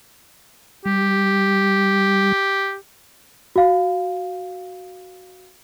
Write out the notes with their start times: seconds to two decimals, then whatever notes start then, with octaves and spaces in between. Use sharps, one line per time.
0.86 G3 G4
3.56 F#4 F5